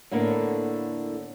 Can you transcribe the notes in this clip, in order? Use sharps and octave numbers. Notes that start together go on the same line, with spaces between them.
A2 D3 A#3 B3